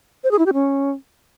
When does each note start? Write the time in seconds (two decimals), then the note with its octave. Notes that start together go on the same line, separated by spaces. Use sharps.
0.24 C5
0.31 G#4
0.39 E4
0.46 G4
0.54 C#4